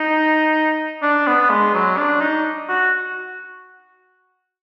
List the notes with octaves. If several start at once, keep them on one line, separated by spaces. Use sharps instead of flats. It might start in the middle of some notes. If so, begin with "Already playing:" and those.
Already playing: D#4
D4
B3
G#3
F#3
D4
D#4
F#4